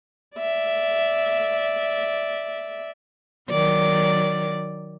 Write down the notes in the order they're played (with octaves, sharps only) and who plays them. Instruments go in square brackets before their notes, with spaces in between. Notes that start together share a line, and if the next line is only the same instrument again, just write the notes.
[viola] D5 E5
[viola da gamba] D#3 F#3 D5